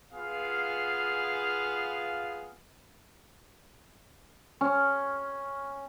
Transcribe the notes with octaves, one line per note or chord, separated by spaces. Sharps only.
B3 F4 G#4 F5
C#4